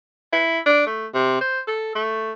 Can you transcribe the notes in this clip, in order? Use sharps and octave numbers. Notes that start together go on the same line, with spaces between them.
E4
D4
A3
C3
C5
A4
A3